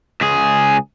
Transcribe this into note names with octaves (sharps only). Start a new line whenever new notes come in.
C#2 G#4